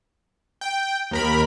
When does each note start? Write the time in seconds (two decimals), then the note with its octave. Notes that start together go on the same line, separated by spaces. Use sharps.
0.61 G5
1.11 D#2 A#4 B5